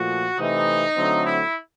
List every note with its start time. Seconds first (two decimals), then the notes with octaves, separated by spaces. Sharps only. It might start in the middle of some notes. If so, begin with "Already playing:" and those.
Already playing: A#2 F3 A3 F#4
0.38 C3 E3 A3 C4 D#4
0.96 D3 F#3 A3 C4
1.24 E4